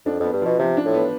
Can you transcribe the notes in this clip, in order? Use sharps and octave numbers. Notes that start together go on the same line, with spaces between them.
F2 D4
F2 B3
G2
B2 F3
C3 F3
D4
A2
B3